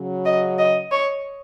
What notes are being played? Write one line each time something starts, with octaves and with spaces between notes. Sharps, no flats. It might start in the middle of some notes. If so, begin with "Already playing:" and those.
Already playing: C#3 F#3
D#5
D#5
C#5